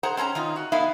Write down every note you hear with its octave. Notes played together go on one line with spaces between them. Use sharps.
G#4 C5 F#5 A#5
C4 C#4 A5 A#5
D#3 D#4 F4
F#4
B3 D#4 E4 F5